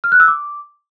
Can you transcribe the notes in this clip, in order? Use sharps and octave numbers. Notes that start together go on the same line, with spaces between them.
F6
F#6
E6
D6